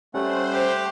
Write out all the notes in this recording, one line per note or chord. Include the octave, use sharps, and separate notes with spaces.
G3 A3 C#4 C5 F#5
G4